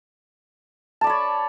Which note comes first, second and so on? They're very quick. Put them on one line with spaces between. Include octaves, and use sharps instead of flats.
A5 D5 B5 C#5